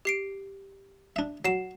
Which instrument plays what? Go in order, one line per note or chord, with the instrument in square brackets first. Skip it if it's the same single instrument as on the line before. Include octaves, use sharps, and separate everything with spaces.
[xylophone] G4 C7 D7
[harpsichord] D4 E5
[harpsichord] F#3 [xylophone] C7 E7